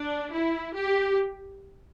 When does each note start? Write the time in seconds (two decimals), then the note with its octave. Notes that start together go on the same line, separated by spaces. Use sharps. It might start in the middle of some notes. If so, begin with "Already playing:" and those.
Already playing: D4
0.32 E4
0.75 G4